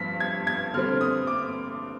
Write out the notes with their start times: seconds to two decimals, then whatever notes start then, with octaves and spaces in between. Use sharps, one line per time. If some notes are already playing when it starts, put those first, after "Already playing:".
Already playing: G2 F3 B6
0.20 G#6
0.47 G#6
0.74 D3 G3 C4 F6
1.01 D#6
1.27 D6